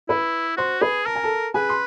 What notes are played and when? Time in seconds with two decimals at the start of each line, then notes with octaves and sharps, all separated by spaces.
0.08 E4 B4 B5
0.57 F#4 C5 C6
0.81 G#4 B4 B5
1.06 A#4 A5
1.15 G#5
1.24 A4 A5
1.54 G#4 B4 G#5
1.69 C6